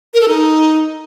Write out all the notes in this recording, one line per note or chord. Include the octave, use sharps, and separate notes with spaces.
A#4
A4
D#4